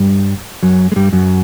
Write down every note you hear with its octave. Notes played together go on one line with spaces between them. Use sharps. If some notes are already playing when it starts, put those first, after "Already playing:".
Already playing: G2 G3
F#2 F#3
G#3
G2 G3
F#2 F#3